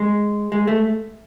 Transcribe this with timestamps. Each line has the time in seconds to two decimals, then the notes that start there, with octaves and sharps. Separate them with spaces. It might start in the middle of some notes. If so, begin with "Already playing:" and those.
Already playing: G#3
0.52 G#3
0.67 A3